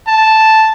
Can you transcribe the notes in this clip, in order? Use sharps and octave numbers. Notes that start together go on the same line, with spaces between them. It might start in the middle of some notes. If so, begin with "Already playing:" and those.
A5